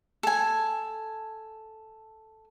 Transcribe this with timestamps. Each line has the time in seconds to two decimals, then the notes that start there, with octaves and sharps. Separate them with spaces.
0.23 A4 G#5